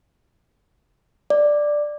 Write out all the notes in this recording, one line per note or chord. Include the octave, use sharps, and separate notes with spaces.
D5